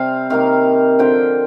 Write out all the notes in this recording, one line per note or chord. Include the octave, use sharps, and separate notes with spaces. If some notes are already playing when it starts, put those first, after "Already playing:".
Already playing: C3 G3 C4 F5
C3 D#3 A#3 F5
D3 F3 C4 G5